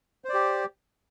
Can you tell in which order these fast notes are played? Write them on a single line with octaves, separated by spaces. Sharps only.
C5 D5 G4